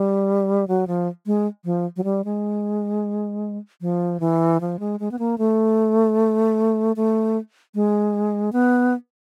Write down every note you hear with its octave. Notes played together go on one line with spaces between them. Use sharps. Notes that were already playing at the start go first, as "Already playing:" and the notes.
Already playing: G3
F#3
F3
G#3
F3
F#3
G3
G#3
F3
E3
F3
G#3
G#3
B3
A#3
A3
A3
G#3
B3